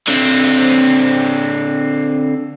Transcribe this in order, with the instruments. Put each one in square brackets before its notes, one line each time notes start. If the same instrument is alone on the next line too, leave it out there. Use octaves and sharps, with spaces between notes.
[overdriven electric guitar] D3 C4